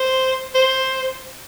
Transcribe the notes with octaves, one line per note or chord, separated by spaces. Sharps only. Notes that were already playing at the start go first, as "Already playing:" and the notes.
Already playing: C5
C5